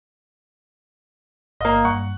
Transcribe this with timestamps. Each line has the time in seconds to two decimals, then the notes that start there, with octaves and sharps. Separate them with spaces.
1.61 G1 A#3 D#5 F5
1.85 G2 F#5 C#6